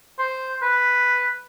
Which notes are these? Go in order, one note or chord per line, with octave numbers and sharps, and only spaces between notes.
C5
B4